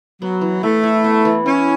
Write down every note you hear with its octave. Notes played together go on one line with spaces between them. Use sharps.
F#3 B3
E3
E3 A3
E4
B3
E3
C#4 E4